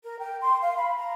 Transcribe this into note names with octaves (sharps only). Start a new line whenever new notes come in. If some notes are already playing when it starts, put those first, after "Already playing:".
A#4
G5
C6
F5
B5
A#5